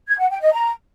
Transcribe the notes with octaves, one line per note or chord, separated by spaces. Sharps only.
G#6
F#5
G5
D#5
A#5